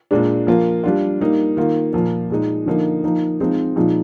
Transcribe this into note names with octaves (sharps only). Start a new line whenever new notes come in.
A#2 G#3 D4
F3 A#3 F4
G3 D4 F4
G3 A#3 D#4
D#3 A#3 F4
A#2 F3 A#3
A#2 G#3 D#4
D3 F3 A#3 D#4
F3 A#3 D#4
F3 G#3 C4 D#4
A#2 F3 G#3 D#4